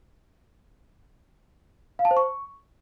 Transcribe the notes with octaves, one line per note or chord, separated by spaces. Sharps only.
F5
A5
C5
C#6